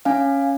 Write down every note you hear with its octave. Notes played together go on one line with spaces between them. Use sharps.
C#4 F5 G#5